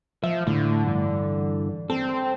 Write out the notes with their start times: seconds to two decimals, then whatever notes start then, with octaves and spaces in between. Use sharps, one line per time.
0.24 F3 E5
0.47 A2 D3
0.86 G2 E3
1.90 C4 A4